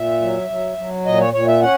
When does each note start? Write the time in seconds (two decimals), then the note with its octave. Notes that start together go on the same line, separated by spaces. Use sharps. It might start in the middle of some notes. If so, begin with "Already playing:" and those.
Already playing: A#2 E5
0.22 F#3
0.50 F#3
0.77 F#3
1.06 A#2 D#5
1.20 C#5
1.34 A#2 C#5
1.48 E5
1.62 C#4 F#5